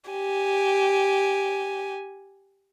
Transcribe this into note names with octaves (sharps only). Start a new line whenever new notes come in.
G4 G#5